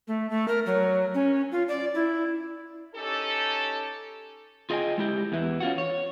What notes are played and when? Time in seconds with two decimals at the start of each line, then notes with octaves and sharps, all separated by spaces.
0.08 A3
0.30 A3
0.48 A#4
0.66 F#3
1.14 C#4
1.52 F4
1.68 D5
1.94 E4
2.95 C#4 D#4 G4 A4
4.70 F4 G#4 D#5 E5 G5 G#5
4.98 G#3 E4 G4
5.32 E2 E3
5.60 C#4 F4 F#4
5.78 C#5